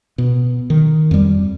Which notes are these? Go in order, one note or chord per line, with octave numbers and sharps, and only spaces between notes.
B2
D#3
F2 G3